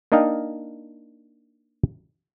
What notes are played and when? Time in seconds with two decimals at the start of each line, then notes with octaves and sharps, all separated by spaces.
0.12 A#3 D4 D#4 D#5 F5 G5